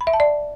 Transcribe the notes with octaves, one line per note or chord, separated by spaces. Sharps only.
B5
E5
A5
D5